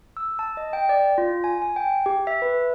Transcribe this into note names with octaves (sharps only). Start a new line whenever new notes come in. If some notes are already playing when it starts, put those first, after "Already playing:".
E6
A5
D#5
G5
D5
F4
G#5
G#5
G5
G4
E5
B4